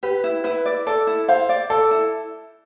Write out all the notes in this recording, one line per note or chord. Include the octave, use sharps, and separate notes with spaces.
G4 B4
E4
E4 B4
D5
A4 D5
E4
C5 F5
D5
A4 D5
E4